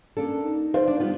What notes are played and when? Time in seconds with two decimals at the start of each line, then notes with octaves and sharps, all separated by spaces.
0.17 A#3 C#4 D4 A4
0.43 D#4
0.74 C5 D5 F5
0.88 D4
1.00 G3 B3 F4